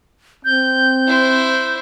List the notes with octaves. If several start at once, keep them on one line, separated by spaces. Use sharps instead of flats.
C4 G6
E4 C5